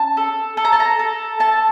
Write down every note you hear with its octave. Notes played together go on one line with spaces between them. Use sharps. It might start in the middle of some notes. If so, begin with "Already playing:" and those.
Already playing: C#4 A5
A4
A4
A#5
A5
A#5
A4
A4 A5